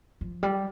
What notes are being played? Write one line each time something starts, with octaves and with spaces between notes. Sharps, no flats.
F3
G3